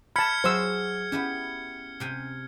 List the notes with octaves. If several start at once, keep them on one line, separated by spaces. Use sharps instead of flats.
A5 B5 F6 G#6 B6 C#7
F#3 F#4 G#4 C5 C#5 E6
B3 C#4 E4 G4
C3 G5 G#5